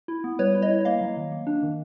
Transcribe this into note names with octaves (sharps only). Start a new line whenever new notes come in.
E4
B3
G3 B4 C#5
E4
C#5 D#5
E4
A#3 D#5 F5
F#3
D#3
A#3
D4
D#3